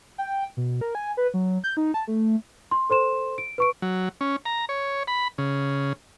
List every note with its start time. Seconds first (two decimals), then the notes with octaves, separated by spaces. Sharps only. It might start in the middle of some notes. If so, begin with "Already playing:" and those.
0.18 G5
0.57 B2
0.81 A#4
0.95 G#5
1.17 B4
1.34 F#3
1.64 G6
1.77 D#4
1.94 A5
2.08 A3
2.71 C6
2.90 A4 C5 C6 E7
3.38 D7
3.58 B4 C#6 D7
3.82 F#3
4.21 C#4
4.46 A#5
4.69 C#5
5.08 B5
5.38 C#3